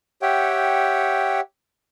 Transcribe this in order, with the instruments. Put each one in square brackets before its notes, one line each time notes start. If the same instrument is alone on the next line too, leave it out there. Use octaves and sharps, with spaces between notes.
[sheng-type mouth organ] G4 C#5 E5 F#5 G5